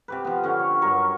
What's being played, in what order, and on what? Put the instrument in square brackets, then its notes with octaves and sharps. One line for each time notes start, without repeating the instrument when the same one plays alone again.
[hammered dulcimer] C3 G4 B4
F3 B3
D3 C#4
C#5
G2 F#3 A#4 C#6